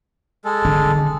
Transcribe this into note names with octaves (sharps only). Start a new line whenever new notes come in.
G#3 A4
D3